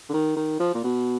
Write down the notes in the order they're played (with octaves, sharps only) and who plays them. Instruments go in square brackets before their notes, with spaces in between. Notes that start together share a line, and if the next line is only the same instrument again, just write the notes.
[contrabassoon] D3
D#3
D#3
F3
A#2
B2